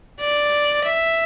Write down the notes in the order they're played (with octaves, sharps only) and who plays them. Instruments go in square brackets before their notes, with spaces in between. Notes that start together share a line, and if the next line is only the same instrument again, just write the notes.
[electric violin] D5
E5